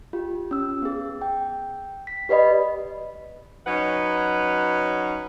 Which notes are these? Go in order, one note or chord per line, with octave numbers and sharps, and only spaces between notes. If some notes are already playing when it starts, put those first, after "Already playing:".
F4 G4
C#4 E6
B3 G#4
G5
B6
G4 B4 D5 D#5 B5
F#3 C#4 D#4 B4 F#5